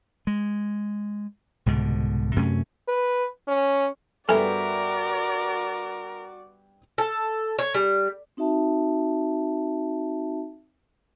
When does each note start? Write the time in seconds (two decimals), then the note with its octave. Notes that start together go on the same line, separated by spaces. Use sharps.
0.27 G#3
1.66 C2 G#2 B2 D3
2.36 F#2 C3 A3 C#4
2.88 B4
3.48 C#4
4.29 G2 B3 F#4 A4 A#4 D5 E5 G#5
6.98 A4
7.59 C#5
7.74 G3
8.37 C4 D#4 F#4 E5 A5